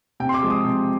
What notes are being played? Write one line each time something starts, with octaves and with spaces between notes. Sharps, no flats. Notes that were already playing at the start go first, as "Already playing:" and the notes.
C3 G5
C6
D6
F3 G#3
D#6
C3